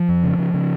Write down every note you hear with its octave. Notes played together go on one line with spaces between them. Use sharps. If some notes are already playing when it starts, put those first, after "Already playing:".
Already playing: F3
F2
C#3
C#3
C#3